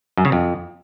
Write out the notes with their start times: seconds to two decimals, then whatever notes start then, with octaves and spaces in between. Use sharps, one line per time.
0.17 F#2
0.25 C#3
0.32 F2